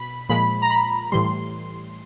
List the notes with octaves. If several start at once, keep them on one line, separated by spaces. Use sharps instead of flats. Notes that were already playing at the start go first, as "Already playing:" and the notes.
Already playing: B2 B5
A#2 F3 G#3 B5
A#5
B5
A2 E3 G3 C6